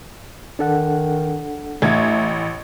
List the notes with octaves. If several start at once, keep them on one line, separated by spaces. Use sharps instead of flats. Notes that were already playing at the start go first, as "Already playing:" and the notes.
D#3 D4 A4 F#5
A1 A3 G#6